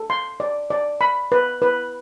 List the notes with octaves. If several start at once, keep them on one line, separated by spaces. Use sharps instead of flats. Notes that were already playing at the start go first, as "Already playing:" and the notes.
Already playing: A4
C6
D5
D5
B5
B4
B4